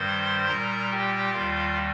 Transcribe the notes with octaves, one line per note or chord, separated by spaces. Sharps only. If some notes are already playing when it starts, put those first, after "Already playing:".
Already playing: G2 D#3 G3 C5 C6
A#2 G3 A#4 A#5
G4 G5
D#2 D#3 G3 F4 F5